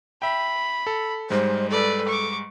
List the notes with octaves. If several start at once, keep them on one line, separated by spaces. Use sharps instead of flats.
E5 G5 B5
A4
G#2 G3 G#3 C5
A4 B4 D5
C#6 D6